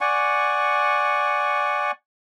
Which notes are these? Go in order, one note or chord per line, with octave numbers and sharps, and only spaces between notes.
D5 F#5 G#5 C#6